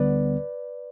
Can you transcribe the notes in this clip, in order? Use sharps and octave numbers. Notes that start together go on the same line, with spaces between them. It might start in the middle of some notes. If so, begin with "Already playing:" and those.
Already playing: D2 D3 G3 B3 B4 D5